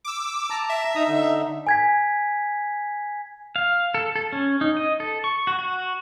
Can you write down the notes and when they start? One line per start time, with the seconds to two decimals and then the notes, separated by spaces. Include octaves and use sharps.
0.05 D6 E6
0.50 A5 A#5
0.69 E5
0.95 D#4 A#5 D#6
1.08 D3 D#4
1.67 G#5 G#6 B6
3.56 F5
3.94 A4
4.16 A4
4.32 C#4
4.61 D#4
4.77 D#5
5.00 A4
5.24 C#6
5.47 F#4
5.59 F#4